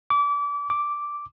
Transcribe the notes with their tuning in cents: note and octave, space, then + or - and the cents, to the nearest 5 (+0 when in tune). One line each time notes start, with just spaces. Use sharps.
D6 -30
D6 -5